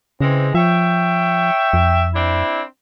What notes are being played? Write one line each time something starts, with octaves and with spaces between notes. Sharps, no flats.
C#3 E3 G#3 C4
F3 C#5 E5 G5
F2
C4 D4 E4